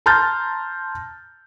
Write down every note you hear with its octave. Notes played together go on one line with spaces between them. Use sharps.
A5 A#5 C6 F6 G6 A6